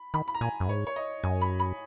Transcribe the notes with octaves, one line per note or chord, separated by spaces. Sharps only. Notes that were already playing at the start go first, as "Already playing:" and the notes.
Already playing: B5
D#3 B5
B5
A#5
A#2 G#5
F#2
G#2 C#5
C#5
D#5
F#2 G#5
B5
B5